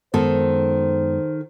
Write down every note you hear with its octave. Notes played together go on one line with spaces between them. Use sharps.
F#2 D#3 G#3 B3 A4 C5